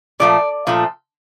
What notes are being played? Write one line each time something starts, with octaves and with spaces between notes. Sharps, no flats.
A#2 F3 A3 D5
A#2 F3 A3